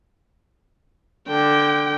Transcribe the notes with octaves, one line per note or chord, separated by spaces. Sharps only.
D3 G5